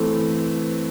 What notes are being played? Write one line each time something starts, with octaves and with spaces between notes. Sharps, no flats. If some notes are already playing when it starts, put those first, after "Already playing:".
Already playing: E3 A3 C4